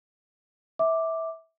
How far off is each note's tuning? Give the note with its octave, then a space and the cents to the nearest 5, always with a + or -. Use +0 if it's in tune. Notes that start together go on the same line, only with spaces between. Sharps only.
E5 -20 D6 +0